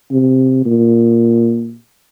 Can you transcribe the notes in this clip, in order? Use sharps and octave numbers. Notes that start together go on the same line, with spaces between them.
C3
A#2